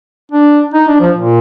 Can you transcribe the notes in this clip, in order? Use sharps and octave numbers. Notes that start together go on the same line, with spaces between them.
D4
D#4
D4
F3
A#2